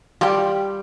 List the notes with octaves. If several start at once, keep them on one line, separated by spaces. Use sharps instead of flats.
G3 F4 G4